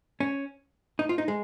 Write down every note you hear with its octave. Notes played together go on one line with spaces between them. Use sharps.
C#4
D#4
F4
D#4
G#3